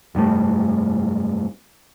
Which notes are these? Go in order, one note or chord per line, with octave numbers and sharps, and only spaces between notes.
F1 G2 C3 A3